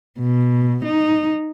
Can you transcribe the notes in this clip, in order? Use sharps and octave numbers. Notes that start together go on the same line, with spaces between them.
B2
D#4